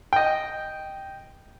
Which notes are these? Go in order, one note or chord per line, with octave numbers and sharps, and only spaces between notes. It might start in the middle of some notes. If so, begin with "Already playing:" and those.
D#5 G5